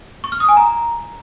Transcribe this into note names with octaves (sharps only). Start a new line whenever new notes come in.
C#6
F6
D#6
G#5
A#5